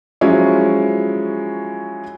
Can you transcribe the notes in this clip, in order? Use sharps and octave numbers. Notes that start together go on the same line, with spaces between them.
F3 F#3 G#3 C#4 E4